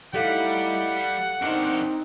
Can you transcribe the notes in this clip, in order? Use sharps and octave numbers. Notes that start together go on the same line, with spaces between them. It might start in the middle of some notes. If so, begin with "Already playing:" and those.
G3 A3 D#4 E4 G4 A4 F5 F#5
C4 D4 D#4 A#4